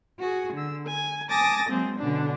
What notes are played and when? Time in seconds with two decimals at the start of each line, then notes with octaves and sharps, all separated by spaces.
0.19 F#4 G#4
0.53 D3 E6
0.85 G#5
1.29 G#5 A5 D6 D#6 A6 A#6
1.68 F#3 G#3 A#3 C4
1.98 B2 D3 C#4 D4